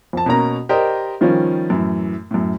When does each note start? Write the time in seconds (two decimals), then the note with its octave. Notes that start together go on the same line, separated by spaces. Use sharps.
0.13 F2 A5
0.26 B2 A#3 C#4 A#5
0.69 G4 A#4 C5 D5 D#5
1.21 D#3 F3 G3 C#4 F4
1.70 F#2 A2 E3
2.31 F#2 A2